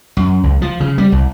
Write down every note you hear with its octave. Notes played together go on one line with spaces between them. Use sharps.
F#2
C#2
F3
C#3
G3
C2